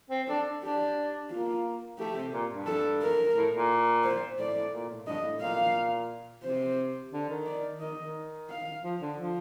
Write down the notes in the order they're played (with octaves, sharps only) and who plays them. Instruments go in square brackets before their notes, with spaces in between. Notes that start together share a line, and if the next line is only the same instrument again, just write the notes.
[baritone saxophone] C4
[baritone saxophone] D4 [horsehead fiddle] A4
[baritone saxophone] D4 [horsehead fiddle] G4
[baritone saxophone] A#3 [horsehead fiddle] F4
[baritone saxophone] A3 [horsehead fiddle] G4
[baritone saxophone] C3
A#2
G2
[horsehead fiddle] A4
A#4
[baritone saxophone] A2
A#2
[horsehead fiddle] C5
[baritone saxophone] A2 [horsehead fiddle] D5
[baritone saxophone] A2
A#2
A2
[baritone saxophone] G2 [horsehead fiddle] D#5
[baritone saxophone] A2
[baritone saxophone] A#2 [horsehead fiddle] F5
[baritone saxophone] C3 [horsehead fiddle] C5
[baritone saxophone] D3
D#3
[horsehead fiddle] D5
[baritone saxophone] D#3 [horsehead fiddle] D#5
[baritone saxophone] D#3
[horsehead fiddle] F5
[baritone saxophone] F3
D3
F3